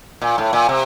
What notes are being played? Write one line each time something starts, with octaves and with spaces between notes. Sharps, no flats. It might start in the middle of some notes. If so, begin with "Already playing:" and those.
A#2
A2
A#2
C3